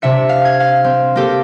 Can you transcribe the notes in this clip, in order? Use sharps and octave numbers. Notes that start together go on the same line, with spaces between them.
C3 D4 E5 C#7
F5
G#6
F5
C4
A#3 G4 A4